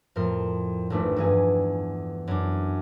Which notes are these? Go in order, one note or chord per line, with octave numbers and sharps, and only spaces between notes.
F2 A2 A#4 C6
G#1 F2 A3 D4 B4
E2 G2 G#4
F#2 D4